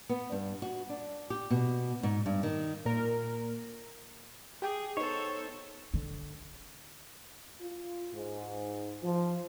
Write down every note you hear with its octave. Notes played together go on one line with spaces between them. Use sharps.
B3
G2
F#4
D4
G4
B2
G#2
G2
D#3
A#2 A#4
G4 G#4 G5
B3 D#4 A4 C5 C#5
D3
F4
G#2
F3